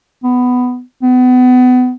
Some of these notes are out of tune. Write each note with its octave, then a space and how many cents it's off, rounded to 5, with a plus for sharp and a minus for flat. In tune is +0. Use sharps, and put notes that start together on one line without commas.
B3 +10
B3 +30